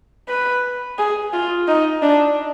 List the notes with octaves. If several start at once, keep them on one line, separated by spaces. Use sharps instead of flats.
B4
G#4
F4
D#4
D4